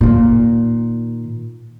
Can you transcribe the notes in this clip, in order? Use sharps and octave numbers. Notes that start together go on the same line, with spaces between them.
A#2 D#3